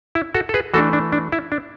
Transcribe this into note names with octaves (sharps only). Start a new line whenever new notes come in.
E4
F#4 A4
A4
G#4 B4
E3 A3 D4 F#4 A4
D4
D4
E4
D4